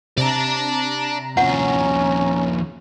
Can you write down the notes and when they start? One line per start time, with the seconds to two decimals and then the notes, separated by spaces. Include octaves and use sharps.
0.18 C3 D5 A5 A#5
1.37 D#2 F3 C#4 F#5